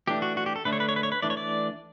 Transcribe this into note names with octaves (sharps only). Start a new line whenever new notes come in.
E3 A3 D4 G4
F#4
F#4
G4
A4
D3 A3 D4 B4
C#5
B4
C#5
B4
C#5
B4
E3 A3 D4 D5
C#5
D5